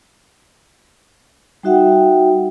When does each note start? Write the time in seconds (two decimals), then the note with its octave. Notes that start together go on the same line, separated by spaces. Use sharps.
1.63 G3 D#4 F#4 E5 F#5 G5